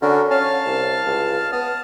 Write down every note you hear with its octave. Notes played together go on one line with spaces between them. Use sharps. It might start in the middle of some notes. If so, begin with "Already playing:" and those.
D3 C#4 F#4 A#4
C#4 F5 A5 F6
C2
C#2
B3 A5 D#6 F6